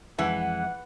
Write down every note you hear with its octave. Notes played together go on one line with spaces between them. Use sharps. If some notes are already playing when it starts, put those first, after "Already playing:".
F2 E3 G#3 F#5